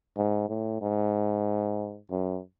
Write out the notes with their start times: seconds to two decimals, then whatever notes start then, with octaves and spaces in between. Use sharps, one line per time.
0.16 G#2
0.49 A2
0.81 G#2
2.10 F#2